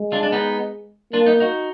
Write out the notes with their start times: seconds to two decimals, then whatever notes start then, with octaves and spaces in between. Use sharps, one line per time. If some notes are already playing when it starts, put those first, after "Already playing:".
Already playing: G#3
0.12 D4 F4
0.23 D4
0.32 B3 D#4
1.13 A#3 D4 F4
1.26 B3 D#4
1.40 D#4 F#4